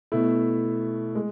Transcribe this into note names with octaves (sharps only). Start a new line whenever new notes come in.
B2 A3 E4
G#3